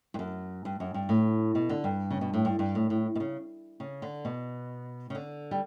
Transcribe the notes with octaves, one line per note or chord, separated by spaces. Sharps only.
G2
F#2
G2
F#2
G2
A2
B2
D3
G2
C#3
B2
A2
G2
G2
A2
A2
B2
C#3
C#3
D3
B2
C#3
D3
G3